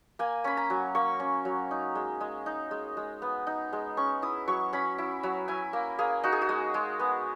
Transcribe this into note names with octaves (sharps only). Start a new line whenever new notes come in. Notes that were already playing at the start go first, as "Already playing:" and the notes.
A#3 G#5
C#4 B5
A#5
F#3
A#3 C#6
C#4
F#3
D#4
G#3
G#3
D#4
G#3
G#3
B3
D#4
G#3
C#4 C#6
E4 D#6
F#3 C#6
C#4 B5
E4
F#3
E4 G#5
A#3
A#3 G#4
D#4 F#4
G#4
F#4
G#3
G#3
B3